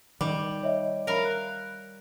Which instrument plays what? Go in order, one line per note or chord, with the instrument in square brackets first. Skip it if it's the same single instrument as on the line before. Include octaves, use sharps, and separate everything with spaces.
[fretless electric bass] D#3 [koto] G3 [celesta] D6
[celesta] C#5 D#5 E5
[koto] A#4 F5 [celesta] C#5 B5
[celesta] F#6